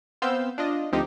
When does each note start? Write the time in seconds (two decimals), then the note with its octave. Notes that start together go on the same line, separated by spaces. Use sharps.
0.22 B3 C4 C5 F5 E6 G6
0.58 D4 F4 D#5
0.92 D2 F3 C4 D#4 G4